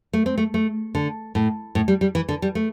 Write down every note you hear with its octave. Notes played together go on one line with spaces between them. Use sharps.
A3
C4
A3
A3
D3
A2
A2
G3
G3
E3
D3
G3
A3